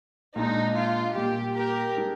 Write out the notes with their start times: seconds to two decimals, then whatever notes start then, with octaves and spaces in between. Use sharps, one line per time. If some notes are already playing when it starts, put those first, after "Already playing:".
0.36 A#2 G#3 D4 D#4
0.76 F4
1.16 A#2 G3 A#3 G4
1.56 G4 A#4
1.96 G3 D4 G#4